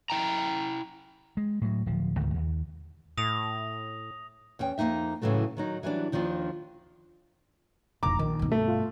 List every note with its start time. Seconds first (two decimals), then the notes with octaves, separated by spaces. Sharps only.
0.10 E4 G5 A#5
1.37 G#3
1.61 A2 F#3
1.86 D1 F3
2.18 C#2 G#2 D#3
2.34 D#2
3.18 A2 D#6 A#6 F7
4.59 E2 C#4 G5
4.78 F2 C#3 A#3 D#4 E5
5.21 A2 C#3 E3 F#3 A3
5.57 D#3 F#3 D#4
5.83 E3 F#3 G3 D4
6.12 D#2 D#3 F3 D4 F4
8.03 F1 B1 A#5 D6
8.19 A#1 D#3
8.39 G2 B2
8.52 A3
8.68 F4